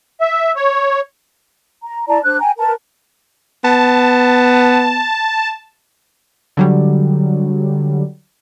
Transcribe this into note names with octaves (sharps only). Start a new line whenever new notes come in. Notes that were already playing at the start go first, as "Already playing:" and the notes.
E5
C#5
A#5
E4 D5 A5 A#5
D4 C5 F#6
G5 G#5 A#5
A#4 B4 A5 A#5
B3 A5
D3 F#3 G3